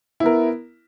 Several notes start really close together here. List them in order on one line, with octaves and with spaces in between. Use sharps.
E4 B3 A#4